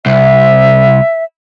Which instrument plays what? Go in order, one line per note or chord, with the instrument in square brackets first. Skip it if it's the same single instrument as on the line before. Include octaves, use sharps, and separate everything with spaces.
[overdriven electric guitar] C2 [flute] E5